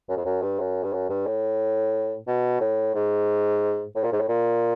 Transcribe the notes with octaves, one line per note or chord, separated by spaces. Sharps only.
F#2
F2
F#2
G2
F#2
G2
F#2
G2
A2
B2
A2
G#2
A2
A#2
G#2
A2
A#2